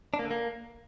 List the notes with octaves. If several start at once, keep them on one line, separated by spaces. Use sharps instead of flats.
D4
A#3
D3
A#3